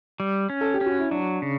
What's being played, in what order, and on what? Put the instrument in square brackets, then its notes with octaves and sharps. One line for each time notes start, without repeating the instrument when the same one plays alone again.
[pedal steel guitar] G3
C#4
[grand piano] A4
G4
[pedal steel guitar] C#4
[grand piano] F#4
E4
[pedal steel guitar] F#3 [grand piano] D4
[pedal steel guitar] C#3